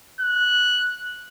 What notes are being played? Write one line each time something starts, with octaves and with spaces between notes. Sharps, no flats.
F#6